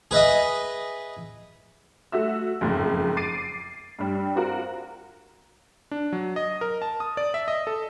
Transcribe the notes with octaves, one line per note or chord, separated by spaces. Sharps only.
G#4 B4 D#5 E5
A3 F#4 E5 E6
F#1 F2 G#2
D6 A6 C7 D7 D#7
G2 G3
C4 F4 F#4 A#4
D4
F#3
D#5
A#4
A5
D#6
D5
E5
D#5
A4